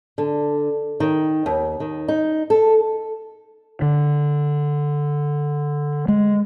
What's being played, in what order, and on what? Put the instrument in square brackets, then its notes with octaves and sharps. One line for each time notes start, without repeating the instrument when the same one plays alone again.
[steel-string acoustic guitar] D3
D#3
D#2
D#3
D#4
A4
[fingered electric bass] D3
G#3